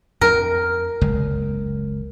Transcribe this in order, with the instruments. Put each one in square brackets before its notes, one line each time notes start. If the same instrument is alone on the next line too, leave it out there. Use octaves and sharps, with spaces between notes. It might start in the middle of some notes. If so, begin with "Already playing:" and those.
[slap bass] F2 [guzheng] A#4
[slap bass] F#1 C#2 G#3